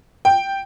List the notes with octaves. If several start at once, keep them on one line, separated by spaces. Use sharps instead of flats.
G5